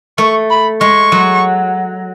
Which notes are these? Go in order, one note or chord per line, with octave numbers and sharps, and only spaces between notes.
A3 C#6
B5
G#3 C#6
F#3